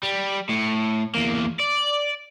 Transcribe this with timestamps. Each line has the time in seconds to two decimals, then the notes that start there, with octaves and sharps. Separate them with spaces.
0.03 G3
0.49 A2
1.15 E2 A#3
1.60 D5